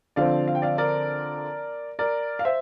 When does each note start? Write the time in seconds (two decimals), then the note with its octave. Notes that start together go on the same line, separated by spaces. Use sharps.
0.16 D3 F3 C4 D5 F5
0.48 F5
0.55 G5
0.62 D5 F5
0.78 A#4 D5
1.99 A#4 D5
2.39 F5
2.45 C5 E5